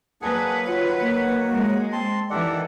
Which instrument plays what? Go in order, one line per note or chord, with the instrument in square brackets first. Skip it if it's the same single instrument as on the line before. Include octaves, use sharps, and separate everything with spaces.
[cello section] F#3 B4 [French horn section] A#3 [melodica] D4 G#4 F#5
[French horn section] D#3 F#4 C#5 [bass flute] F4 [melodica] F#5
[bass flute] A#3
[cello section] G#3
[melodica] C4 A5 C6
[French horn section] D#3 D5 [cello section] E3 [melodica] G4 A4 F#5